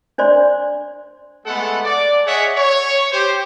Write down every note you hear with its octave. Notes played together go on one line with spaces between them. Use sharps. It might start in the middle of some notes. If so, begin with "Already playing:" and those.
D4 C5 D5 C6
G#3 A3 B3 A4 F#5
D5
G#4 C#5 D#5 E5 F#5
C#5
G4 C5